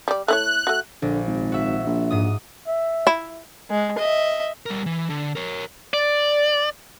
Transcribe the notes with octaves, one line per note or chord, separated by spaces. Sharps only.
G3 D5
A3 E4 C#5 F#6
A3 F#4
A#1 D3
G#1
F#4 E5
A#1
G#2 D#6
E5
E4
G#3
D#5 E5
G3 A#4
E3
D3
A#4 C#5
D5